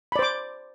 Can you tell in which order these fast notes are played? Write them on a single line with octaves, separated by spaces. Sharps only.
B5 D5 C5 D6